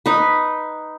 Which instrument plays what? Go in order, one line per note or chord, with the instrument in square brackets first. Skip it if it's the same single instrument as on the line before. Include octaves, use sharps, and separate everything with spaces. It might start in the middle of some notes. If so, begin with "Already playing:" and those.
[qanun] D#4 B4